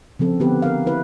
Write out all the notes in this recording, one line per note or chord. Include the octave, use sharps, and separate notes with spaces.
C#3 F3 C4 A4
D3 B3 C4 G4 B4
A#4 F5
E4 B4